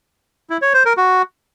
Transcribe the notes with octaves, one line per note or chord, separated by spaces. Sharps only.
E4
C#5
C5
A#4
F#4